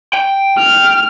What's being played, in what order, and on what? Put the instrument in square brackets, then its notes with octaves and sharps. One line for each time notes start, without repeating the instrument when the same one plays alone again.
[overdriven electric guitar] G5
[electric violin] F6